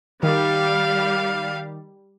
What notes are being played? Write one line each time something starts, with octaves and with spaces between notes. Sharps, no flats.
D#3 G3 F5